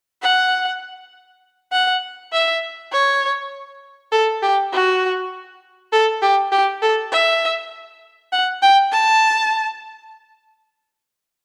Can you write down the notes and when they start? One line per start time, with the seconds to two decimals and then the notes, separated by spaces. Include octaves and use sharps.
0.22 F#5
1.72 F#5
2.33 E5
2.92 C#5
4.12 A4
4.42 G4
4.72 F#4
5.92 A4
6.22 G4
6.52 G4
6.82 A4
7.12 E5
8.32 F#5
8.62 G5
8.92 A5